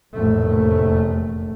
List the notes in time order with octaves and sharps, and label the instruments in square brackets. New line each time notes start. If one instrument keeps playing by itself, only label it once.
[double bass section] F1 A#1 E2 A2 A3